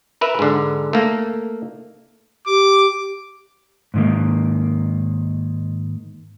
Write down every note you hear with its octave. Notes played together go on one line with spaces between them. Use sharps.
A#4 B4 E5
G#2 D3
A3 A#3
G4 D6
G#2 D#3 A#3